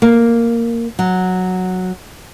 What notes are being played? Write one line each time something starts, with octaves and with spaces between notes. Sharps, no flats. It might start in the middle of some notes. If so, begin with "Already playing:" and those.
A#3
F#3